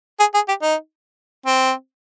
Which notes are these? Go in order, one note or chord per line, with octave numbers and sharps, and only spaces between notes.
G#4
G#4
G4
D#4
C4